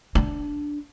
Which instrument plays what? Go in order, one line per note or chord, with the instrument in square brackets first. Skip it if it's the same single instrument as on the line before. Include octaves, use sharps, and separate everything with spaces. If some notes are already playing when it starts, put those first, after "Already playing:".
[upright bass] D4